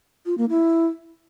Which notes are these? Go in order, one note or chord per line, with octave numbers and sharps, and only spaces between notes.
F4
A#3
E4